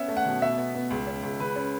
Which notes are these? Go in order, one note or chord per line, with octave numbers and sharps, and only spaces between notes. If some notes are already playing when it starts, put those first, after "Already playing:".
Already playing: B3 C#4 E5
A3
F#5
B2
B2 E5
B3
B3
C#2
C#4
C#2
C#3 B4
C#4